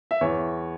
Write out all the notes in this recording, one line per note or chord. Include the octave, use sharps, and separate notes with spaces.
E5
E2 C#5